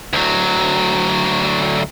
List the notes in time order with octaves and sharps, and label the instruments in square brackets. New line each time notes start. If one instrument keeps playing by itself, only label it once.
[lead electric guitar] D2 F#3